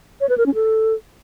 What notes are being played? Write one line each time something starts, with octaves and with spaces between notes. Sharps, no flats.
C#5
B4
A#4
C#4
A4